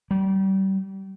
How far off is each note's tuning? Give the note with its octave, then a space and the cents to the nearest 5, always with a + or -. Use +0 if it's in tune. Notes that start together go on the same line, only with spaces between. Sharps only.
G3 -30